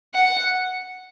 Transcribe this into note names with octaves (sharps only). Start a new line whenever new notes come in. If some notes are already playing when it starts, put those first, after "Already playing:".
F#5